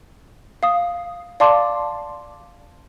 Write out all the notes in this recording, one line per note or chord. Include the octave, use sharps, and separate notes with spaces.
F5 D#6
D5 F5 A5 C6 D6